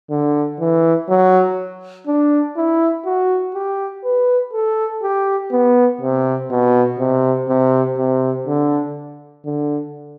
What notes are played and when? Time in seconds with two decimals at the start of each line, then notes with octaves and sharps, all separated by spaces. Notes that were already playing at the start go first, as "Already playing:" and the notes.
0.10 D3
0.60 E3
1.09 F#3
2.07 D4
2.56 E4
3.05 F#4
3.54 G4
4.04 B4
4.53 A4
5.03 G4
5.51 B3
6.01 C3
6.50 B2
6.99 C3
7.49 C3
7.98 C3
8.47 D3
9.45 D3